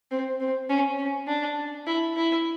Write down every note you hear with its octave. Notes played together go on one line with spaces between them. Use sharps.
C4
C4
C#4
C#4
D4
E4
E4